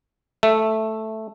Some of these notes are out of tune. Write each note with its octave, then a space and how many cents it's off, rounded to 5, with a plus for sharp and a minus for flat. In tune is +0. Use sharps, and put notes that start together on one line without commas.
A3 +0 E5 +5